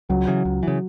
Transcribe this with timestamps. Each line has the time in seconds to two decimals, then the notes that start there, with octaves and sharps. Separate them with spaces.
0.09 C#2 F#3
0.27 C#3 E3
0.45 C#2
0.63 C#3 E3